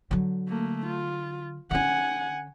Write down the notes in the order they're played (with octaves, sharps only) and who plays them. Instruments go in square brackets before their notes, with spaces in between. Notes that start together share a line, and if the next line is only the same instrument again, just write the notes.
[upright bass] D3 F#3
[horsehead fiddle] A3 A#3
F4
[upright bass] D3 C#4 [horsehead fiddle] F#5 G#5